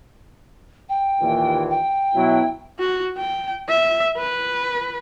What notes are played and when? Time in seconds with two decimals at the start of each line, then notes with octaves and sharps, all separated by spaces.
0.89 G5
1.21 D#2 A#2 E3
1.70 G5
2.15 B2 F#3 E4
2.79 F#4
3.17 G5
3.68 E5
4.17 B4